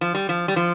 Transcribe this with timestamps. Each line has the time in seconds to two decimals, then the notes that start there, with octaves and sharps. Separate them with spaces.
0.01 F3
0.15 G3
0.29 F3
0.48 G3
0.56 F3